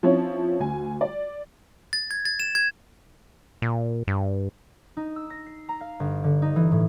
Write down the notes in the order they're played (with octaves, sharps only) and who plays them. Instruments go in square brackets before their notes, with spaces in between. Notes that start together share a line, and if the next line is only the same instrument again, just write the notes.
[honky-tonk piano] F3 C4 C#4 E4 C#5
D2 G#5
D5
[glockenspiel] A6
G#6
A6
E7
G#6
[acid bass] A#2
G2
[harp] D#4
E6
A#6
C7
A#5
F5
G1
D3
D#4
E3
A2